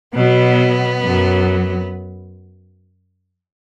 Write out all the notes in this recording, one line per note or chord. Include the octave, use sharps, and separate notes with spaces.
B2 F#3 B3
F#2 F#3